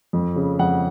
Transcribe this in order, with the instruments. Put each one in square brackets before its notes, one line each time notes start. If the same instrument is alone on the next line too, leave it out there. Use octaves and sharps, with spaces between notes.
[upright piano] F2
C#3
F2 F#5